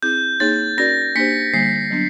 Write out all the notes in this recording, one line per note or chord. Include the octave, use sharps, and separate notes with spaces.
C4 E4 G#4 G6
A#3 D#4 G#4 C#5 A6
C#4 F#4 A#4 D5 A#6
A#3 D4 G4 C5 B6 C#7
D3 G3 A#3 C7
F#3 B3 D4